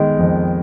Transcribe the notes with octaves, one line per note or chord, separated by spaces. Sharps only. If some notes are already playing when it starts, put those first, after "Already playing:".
Already playing: D#3 G#3 B3
F2